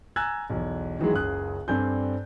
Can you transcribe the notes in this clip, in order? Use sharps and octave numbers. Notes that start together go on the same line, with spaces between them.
G#5 A#5 E6 F#6 G#6 A6
B1 E2
D#3 E3 F#3 G#3
F#1 C#2 G#4 D#6 F#6
G2 C4 A4 D5 G#5 G6